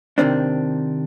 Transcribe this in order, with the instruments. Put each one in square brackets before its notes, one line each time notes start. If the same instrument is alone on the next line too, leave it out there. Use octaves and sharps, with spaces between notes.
[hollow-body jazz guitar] C3 D#3 C4 D4